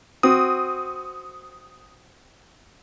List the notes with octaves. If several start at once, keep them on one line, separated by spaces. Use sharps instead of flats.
C4 F#4 D#6